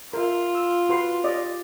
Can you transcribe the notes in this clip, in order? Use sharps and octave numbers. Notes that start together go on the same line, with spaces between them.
F4 A#4 E5
E6
F#4 B4 C6
G4 D5 D#5